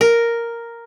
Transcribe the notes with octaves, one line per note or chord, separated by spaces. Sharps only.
A#4